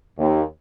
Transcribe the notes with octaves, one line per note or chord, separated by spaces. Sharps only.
D#2